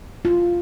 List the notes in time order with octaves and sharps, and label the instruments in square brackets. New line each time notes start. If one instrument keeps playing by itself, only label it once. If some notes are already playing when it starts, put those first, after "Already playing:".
[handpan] F4